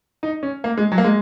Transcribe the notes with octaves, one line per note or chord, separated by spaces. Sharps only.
D#4
C#4
A#3
G#3
F#3
A#3
G#3